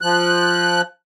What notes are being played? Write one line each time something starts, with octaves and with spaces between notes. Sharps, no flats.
F3 F#6